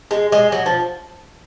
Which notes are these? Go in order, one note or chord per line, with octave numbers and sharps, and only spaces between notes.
G#3
G#3
F#3
F3